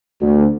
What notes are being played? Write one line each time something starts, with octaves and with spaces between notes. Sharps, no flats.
D2